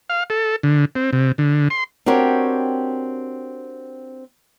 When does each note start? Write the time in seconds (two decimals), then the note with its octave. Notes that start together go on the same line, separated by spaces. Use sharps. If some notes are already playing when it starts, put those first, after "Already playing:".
0.10 F5
0.30 A4
0.63 D3
0.95 C4
1.13 C3
1.38 D3
1.70 C6
2.06 C4 D4 F#4 G4 A#4 C#5